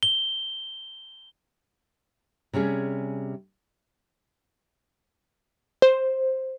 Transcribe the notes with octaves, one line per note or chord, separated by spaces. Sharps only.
G7
C3 G3 C#4 G#4
C5